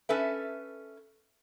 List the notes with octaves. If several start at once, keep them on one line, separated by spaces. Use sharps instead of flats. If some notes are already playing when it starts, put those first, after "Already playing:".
C#4 A4 B4 E5